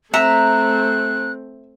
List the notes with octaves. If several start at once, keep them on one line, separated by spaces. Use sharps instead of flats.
A3 C4 E5 A#5 F#6